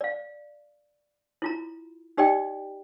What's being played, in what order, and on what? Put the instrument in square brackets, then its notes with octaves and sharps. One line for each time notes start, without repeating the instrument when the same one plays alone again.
[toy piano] D5 F5
E4 F4 A#5
D#4 G4 D5 D#5 G5